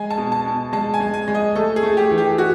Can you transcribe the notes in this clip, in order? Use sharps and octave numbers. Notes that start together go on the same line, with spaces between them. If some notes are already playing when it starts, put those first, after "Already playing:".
Already playing: G#3 G#5
A5
B2
A5
B2
G#3 A5
G#5
G#3
G#5
G#3
D#5
A3 A4
G#4
A3
G4
E3
G4
F#4